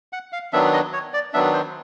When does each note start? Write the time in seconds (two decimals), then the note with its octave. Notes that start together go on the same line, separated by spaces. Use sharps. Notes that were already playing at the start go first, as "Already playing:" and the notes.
0.13 F#5
0.32 F5
0.53 D#3 F#3 B3 D4 E5
0.73 D#5
0.93 C#5
1.13 D5
1.33 D#3 F#3 B3 D4 E5
1.54 C5